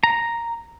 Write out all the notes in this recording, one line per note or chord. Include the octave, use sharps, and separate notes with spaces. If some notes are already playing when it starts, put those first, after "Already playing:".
A#5